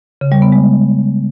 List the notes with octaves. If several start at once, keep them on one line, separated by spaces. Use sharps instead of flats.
C#3
G3
B3
G#3